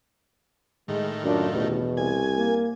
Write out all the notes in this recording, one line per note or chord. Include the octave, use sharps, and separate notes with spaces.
A2 D#3 G#3
F#2 D4 D#4 F4
A1 E2 B2
C2 G#5
A#3